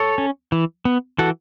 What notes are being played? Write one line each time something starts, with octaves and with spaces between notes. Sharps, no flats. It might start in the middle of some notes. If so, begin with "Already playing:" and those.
Already playing: A4 C#5
C#4
E3
B3
E3 F#4 A4